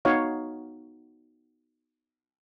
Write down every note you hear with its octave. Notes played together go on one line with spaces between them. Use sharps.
B3 D#4 F#4 C#5 F5